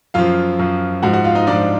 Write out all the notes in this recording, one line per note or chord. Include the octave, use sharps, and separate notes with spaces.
F#2 F3 F4 F5
F#2 F3
G#2 F3 F#4 F#5
F#4 F#5
F4 F5
D#4 D#5
G#2 F3 D4 D5